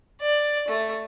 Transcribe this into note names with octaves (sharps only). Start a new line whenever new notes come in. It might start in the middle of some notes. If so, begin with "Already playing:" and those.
D5
A3